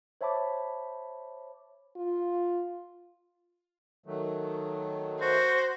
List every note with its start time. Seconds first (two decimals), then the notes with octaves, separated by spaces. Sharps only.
0.21 C5 C#5 E5 A5 B5 D6
1.96 F4
4.06 D#3 F#3 A3
5.21 F#4 C5